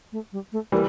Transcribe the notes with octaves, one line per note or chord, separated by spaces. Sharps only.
A3
G3
A3
E3 G3 A#3